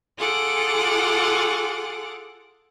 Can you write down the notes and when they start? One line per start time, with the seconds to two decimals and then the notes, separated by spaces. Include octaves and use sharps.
0.18 F4 G#4 A4 F#5 D6